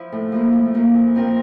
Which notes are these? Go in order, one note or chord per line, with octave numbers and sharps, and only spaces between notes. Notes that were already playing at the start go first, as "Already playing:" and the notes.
Already playing: F3 E4
A2
F3 A#3 E4
A2
F3 A#3 E4
A#2
F3 C4 F4 A#4